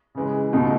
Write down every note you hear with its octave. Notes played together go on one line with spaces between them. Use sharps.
C#3 E3 G#3
C#2 B2 A3 D#4